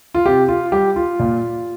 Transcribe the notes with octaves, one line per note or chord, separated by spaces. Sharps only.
F4
C3 G4
F4
G3 G4
F4
A#2